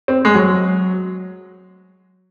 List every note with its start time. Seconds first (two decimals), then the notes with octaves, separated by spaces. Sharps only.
0.08 C4
0.25 G#3
0.35 F#3